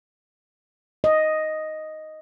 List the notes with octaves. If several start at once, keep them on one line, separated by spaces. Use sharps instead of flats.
D#5